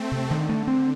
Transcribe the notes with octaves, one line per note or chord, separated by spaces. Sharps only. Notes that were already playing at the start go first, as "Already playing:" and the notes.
Already playing: A3 C4
C3
D3 D#3
A3
C4